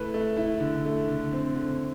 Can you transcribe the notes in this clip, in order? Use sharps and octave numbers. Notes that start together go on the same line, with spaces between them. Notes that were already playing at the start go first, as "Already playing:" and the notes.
Already playing: A3 E4 B4
A3
E4
D3
A3
D3
C4
D3